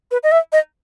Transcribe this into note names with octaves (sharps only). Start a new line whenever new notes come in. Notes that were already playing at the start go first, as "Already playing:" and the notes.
B4
D#5
E5
D#5